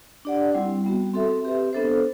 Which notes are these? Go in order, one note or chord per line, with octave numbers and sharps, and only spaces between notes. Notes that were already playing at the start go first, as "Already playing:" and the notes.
D4 G4 D5 F#5
G3 C4 E4
G3 B3 F#4
C4 F#4 A4 E5
C4 G4 B4 E5
B3 D4 A4 C5